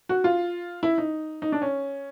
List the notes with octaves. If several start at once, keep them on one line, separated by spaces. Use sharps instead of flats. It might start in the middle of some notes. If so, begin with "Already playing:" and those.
F#4
F4
E4
D#4
D#4
D4
C#4